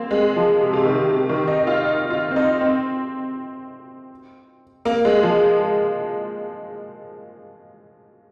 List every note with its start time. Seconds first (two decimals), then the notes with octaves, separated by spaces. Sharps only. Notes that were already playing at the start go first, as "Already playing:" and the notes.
Already playing: A#3 C4
0.11 G#3
0.36 F3
0.60 C3
0.73 C3
0.85 D#3
1.10 C3
1.29 D#3
1.48 D#4
1.59 D#4
1.67 F4
1.85 D#4
2.10 F4
2.31 C4
2.36 D#4
2.61 C4
4.85 A#3
5.05 G#3
5.23 F3